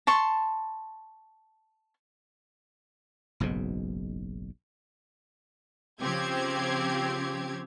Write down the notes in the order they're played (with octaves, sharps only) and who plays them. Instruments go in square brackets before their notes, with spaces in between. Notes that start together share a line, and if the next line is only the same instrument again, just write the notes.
[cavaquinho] A5 C6 C#6
[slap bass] F#1 B1 G#2 B2
[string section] C#3 F3 C4 G4 G#6